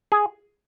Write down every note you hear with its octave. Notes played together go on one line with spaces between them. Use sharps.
G#4